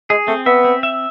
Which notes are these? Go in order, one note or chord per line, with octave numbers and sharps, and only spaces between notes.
G#3 G#4
A3 C4
B3 E5
C4
E5